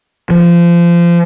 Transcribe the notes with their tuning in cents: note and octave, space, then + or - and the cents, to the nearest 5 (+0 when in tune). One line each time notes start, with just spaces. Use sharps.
F3 -25